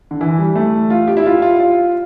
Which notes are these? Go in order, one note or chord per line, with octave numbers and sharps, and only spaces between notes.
D3
E3
G3
A3
F4
G4
E4
F4
F4
F4